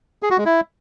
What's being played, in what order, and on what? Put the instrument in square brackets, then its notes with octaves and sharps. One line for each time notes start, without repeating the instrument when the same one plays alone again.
[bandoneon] G#4
F#4
G#3
E4